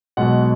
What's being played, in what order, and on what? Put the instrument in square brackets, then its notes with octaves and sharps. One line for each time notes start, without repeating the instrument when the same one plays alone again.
[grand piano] B1 B2 G#3 F#5